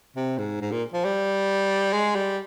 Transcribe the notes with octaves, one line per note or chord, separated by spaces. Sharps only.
C3
G#2
G#2
A#2
F3
G3
G#3
G3